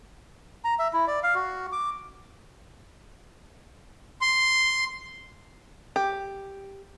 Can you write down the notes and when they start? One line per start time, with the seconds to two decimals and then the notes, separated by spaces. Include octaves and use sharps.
0.64 A#5
0.79 E5
0.93 E4
1.07 D5
1.23 F5
1.35 F#4
1.72 D6
4.21 C6
5.96 G4